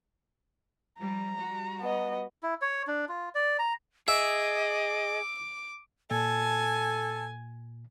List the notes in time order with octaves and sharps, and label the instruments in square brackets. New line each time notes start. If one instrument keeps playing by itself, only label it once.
[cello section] F3 G3 [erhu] A#5
[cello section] G3 F#4
[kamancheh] B3 D#5
[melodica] E4
C#5
D4
F4
D5
A#5
[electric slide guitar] G#4 [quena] D#5 [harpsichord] E5 [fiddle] D6
[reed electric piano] A#2 [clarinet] A4 [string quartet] G#5 [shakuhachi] A5